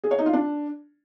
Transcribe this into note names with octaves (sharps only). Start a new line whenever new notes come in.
G#4
C#5
D#4
F4
D4